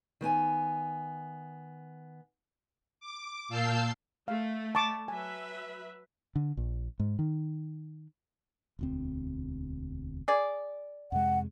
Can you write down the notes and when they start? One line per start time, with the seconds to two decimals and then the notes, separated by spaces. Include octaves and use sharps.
0.21 D#3 B3 G5 G#5
3.00 D6
3.49 A#2 F5 A5 E6 G6 C7
4.28 A3 F5
4.75 A5 C#6 D6
5.08 F#3 B4 E5 G#5
6.36 D3
6.57 A#1
6.99 G#2
7.19 D#3
8.79 E1 D2 C4
10.28 G#4 D5
11.12 F2 C3 G#3 F#5